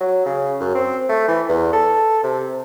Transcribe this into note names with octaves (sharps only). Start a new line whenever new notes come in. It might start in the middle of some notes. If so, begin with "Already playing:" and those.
F#3
C#3
F#2
C4
A3
E3
E2
A4
C3